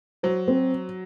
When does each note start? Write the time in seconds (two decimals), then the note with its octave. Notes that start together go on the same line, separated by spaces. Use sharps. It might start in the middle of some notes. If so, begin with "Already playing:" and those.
0.23 F#3 C5
0.48 C4